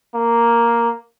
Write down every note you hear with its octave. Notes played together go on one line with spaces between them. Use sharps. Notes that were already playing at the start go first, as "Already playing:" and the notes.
A#3